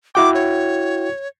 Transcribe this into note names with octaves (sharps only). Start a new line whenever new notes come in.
E4 F#4 G5 D6
C#5